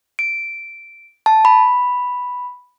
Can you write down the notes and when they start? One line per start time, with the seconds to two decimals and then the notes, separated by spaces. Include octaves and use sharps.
0.19 D7
1.26 A5
1.45 B5